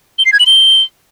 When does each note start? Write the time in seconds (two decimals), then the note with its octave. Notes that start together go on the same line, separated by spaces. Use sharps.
0.18 G7
0.25 C7
0.32 G#6
0.39 F#7
0.46 G7